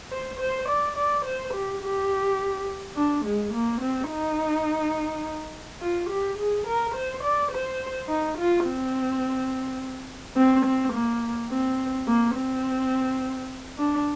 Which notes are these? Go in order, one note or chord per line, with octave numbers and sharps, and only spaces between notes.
C5
C5
D5
D5
C5
G4
G4
D4
G#3
A#3
C4
D#4
F4
G4
G#4
A#4
C5
D5
C5
D#4
F4
C4
C4
C4
A#3
C4
A#3
C4
D4